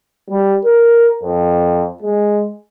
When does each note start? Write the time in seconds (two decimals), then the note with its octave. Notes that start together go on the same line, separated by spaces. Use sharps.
0.29 G3
0.64 A#4
1.22 F2
2.02 G#3